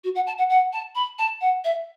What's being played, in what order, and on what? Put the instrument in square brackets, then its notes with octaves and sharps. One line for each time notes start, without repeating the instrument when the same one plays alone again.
[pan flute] F#4
F#5
A5
F#5
F#5
A5
B5
A5
F#5
E5